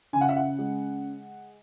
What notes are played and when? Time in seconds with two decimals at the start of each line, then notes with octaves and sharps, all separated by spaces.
0.13 C#3 G#5
0.21 F#5
0.29 E5
0.36 F#5
0.59 G#3